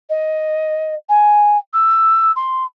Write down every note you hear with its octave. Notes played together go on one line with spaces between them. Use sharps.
D#5
G#5
E6
C6